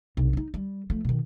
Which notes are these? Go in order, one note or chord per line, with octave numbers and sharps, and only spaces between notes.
B1 C3
C#4 D#4
G3
F3 A3
B2 D#3